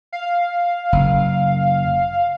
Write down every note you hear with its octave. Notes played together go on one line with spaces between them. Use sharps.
F5
F#1